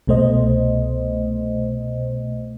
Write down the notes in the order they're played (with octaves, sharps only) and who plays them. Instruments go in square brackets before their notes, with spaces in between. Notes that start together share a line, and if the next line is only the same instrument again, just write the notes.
[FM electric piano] C2 B2 A3 C5 D#5